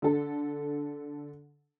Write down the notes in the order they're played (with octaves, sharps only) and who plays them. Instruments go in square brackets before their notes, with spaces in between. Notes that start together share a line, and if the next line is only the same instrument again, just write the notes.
[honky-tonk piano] D3 A4